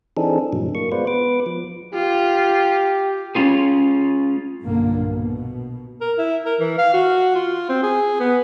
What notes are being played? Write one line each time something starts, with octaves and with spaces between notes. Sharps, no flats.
E3 C4 D4 D#4 G#4 A4
G2 A#2 D3 E3 F#3
A#3 C#6
G#3 B3 F4 B4 C5 D5
B3 B4 D6
F3
F4 G4
G#3 C#4 F4 G#4
B1 G2 A#2 D3 A#3
B2
A#4
E4
A#4
E3
F5
F#4
F4
C4
G#4
B3